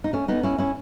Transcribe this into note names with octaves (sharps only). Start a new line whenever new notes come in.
D#4
A3 C#4
B3 D#4
C#4 E4
C#4 E4